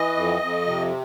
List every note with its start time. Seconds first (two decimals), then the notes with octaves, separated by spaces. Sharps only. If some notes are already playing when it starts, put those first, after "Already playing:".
Already playing: E3 D#5
0.16 F2
0.41 F2
0.67 C3